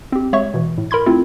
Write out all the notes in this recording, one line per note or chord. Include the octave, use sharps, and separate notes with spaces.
C4 G4
G#3 C#5 E5 C#6
B2 E3
A2
A#4 B5 C6 G#6
A3 C4 E4 F4 A4